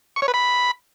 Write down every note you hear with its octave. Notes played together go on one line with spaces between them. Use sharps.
C#6
C#5
B4
B5